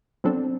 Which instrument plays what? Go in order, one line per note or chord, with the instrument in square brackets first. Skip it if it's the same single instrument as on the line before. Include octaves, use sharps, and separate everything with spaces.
[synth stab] F#3 B3 D4 A4 [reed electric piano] C4